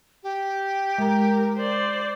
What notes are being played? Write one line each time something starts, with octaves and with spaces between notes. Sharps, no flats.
G4
G#3 A#4 A#5
C5 D5